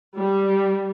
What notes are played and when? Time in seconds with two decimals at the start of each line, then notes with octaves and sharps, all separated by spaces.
0.17 G3